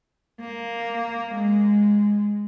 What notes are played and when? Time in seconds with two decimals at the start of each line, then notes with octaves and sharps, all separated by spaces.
0.40 A#3
1.34 G#3